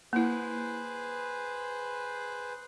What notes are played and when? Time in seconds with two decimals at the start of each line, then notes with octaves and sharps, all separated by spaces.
0.13 A#3 E4 G#4 B4 C5